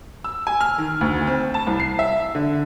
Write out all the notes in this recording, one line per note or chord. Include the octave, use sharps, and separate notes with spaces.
E6
G#5
F6
D#3
D2
C4
A5
C2
C7
E5
D3